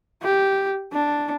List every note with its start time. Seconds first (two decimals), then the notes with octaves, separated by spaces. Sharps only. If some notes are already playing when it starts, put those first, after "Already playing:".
0.22 G4
0.92 D4